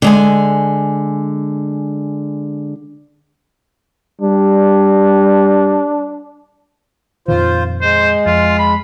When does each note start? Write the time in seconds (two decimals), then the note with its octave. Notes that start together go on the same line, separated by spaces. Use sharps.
0.02 D3 G#3 G#5
4.21 G3 D4
7.28 F2 A#2 D#3 F4 C5
7.82 G#3 C5
8.26 F2 F4
8.58 B5